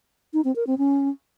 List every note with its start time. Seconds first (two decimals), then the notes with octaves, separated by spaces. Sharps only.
0.33 D#4
0.45 C4
0.56 A#4
0.67 C4
0.78 C#4